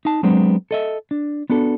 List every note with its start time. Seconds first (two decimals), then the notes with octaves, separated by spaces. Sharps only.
0.05 D#4 A5
0.23 F#3 G#3 B3 C4 D4
0.71 A4 D#5 E5
1.11 D4
1.50 B3 D4 F#4 A4